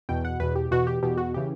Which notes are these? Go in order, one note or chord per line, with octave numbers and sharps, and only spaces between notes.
E2 B2 G5
F#5
E2 B2 B4
G4
E2 B2 F#4
G4
E2 B2 G4
F#4
C#3 E3 G4